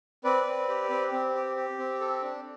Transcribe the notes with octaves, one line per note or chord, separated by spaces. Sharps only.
C4 B4 D5
C4
G4
C4
C4
G4
G4
C4
A4
D4